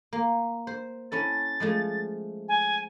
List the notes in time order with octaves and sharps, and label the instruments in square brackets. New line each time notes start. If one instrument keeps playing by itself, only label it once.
[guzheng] A#3
C5
[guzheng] C#4 E4 A4 [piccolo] A6
[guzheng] F3 G#3 A3
[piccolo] G#5